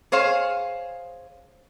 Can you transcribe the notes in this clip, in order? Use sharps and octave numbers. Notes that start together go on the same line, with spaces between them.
G#4 C5 C#5 F5